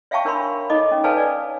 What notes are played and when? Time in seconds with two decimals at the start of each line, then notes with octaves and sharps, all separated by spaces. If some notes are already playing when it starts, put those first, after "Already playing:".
0.11 C#5 E5 F5 G5 A5 C#6
0.25 D4 A#4 C#5 E5 B5 C6
0.70 D#4 A4 D#5 D6
0.91 C#4
1.04 A4 B4 C#5 F5 G#5 A5
1.17 D5